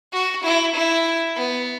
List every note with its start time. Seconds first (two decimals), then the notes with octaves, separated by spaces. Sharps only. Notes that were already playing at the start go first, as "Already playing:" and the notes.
0.13 F#4
0.44 E4
0.75 E4
1.37 B3